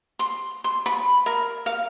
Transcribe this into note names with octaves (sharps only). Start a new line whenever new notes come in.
C6
C6
B5
A#4
F5